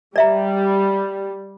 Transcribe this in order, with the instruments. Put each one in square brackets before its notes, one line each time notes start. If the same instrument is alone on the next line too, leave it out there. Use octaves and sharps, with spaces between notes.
[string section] G3 [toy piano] D5 E5 A#5